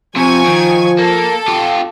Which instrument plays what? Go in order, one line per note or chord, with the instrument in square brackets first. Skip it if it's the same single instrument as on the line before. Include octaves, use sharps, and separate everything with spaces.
[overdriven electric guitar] C3 [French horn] F3 [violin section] G#5 C#6 G#6
[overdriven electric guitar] D#3
[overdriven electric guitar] A#3 [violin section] A4
[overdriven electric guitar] F4 G4